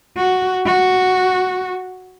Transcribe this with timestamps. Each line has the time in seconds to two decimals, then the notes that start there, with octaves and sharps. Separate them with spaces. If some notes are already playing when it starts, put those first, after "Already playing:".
0.17 F#4
0.66 F#4